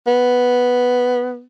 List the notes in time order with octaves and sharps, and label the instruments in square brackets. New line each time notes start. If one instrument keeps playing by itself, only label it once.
[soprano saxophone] B3